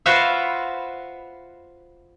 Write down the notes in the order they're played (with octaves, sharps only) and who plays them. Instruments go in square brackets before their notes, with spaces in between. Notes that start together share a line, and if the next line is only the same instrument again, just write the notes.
[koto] F4 F#4 B4 C5 E5 F5